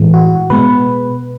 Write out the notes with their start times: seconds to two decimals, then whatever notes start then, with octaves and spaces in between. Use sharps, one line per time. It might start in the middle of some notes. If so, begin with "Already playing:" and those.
Already playing: A2 E3 G#3
0.14 F#4
0.50 B2 G#3 B3 B4